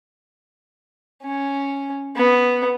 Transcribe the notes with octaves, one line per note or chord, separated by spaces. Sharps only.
C#4
B3